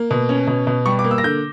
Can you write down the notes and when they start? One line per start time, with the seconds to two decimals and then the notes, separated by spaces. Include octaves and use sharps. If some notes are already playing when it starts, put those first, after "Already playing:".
Already playing: A#3
0.11 B2
0.29 C#4
0.47 B2
0.67 B2
0.86 G3 C#6
0.99 D6
1.04 A#3
1.11 E6
1.18 A#6
1.24 D3 G6